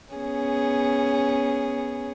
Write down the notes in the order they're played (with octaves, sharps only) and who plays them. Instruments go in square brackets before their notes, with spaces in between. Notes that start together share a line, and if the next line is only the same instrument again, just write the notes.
[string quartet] B3 C#4 G#4